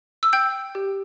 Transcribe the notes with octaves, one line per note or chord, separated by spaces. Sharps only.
E6
G5 G6
G4